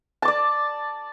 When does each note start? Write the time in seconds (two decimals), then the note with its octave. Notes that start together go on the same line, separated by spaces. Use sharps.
0.22 A5
0.25 D6
0.28 D5